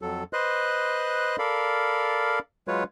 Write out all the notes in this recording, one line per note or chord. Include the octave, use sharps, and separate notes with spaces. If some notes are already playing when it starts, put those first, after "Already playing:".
F2 F#3 A4
B4 C5 D#5 C6 F#6
A4 A#4 D5 F5 B5
F#3 G#3 F4 B4 C#5